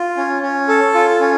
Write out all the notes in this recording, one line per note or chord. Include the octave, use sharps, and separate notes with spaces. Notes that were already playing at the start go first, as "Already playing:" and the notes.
Already playing: F4
C#4
C#4
A4
F4
C#4